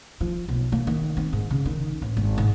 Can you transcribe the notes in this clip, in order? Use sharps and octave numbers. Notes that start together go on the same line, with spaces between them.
F3
B1
A#3
D#3
C4
G#2
C#3
D#3
A1
G#1
G#2